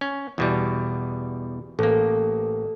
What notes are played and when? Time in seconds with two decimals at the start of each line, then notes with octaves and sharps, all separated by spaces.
0.01 C#4
0.38 E2 B2 G3
1.79 A1 A#3 A4